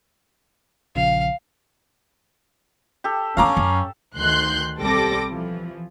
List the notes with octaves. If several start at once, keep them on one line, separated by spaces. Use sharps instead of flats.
A#1 C#3 F3 F5
G4 A4
E2 C#4 D4 F5 A#5 D6
F#2
D2 D#3 C6 F#6 G6
B1 G3 C4 A4 D6 A#6
E3 F3